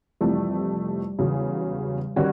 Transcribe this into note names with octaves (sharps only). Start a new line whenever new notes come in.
F2 C3 E3 G3 A3
E2 C#3 F#3
D#3 G3 C#4 F#4